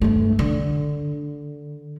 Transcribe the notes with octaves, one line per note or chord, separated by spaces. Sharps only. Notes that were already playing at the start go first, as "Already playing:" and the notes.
G1 A3
D3